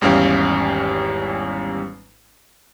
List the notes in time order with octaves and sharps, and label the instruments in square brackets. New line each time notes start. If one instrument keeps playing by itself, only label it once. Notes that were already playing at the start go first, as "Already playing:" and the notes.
[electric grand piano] G#1 E2 G3 C#4 F5 G5